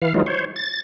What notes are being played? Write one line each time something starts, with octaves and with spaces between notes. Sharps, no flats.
E3 F5
E3 F#3 G#3 D#4 F4
C5 C#5
A6